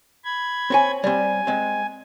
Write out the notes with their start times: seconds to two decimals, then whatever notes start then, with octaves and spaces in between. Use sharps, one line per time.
0.24 B5 G#6
0.70 C4 C#5 G#5
1.04 G3 C4 G#5
1.47 G#3 C4